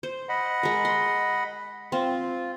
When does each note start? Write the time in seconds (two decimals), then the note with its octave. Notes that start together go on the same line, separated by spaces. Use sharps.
0.03 C5
0.29 D#5 F#5 B5
0.63 G#3 A#4
0.85 C6
1.92 C4 F4